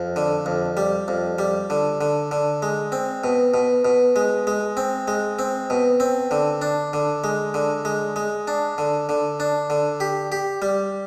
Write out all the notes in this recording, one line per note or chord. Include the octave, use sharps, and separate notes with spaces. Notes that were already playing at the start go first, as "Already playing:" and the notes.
Already playing: F2
D3
F2
G3
F2
G3
D3
D3
D3
G#3
C4
B2
B2
B2
G#3
G#3
C4
G#3
C4
B2
C4
D3
D4
D3
G#3
D3
G#3
G#3
D4
D3
D3
D4
D3
G4
G4
G3